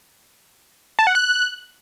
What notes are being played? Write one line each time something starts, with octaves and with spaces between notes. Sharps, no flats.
A5
F#5
F#6